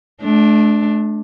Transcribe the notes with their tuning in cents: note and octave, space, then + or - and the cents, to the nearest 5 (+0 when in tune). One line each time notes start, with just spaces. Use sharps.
A3 -40 D4 +0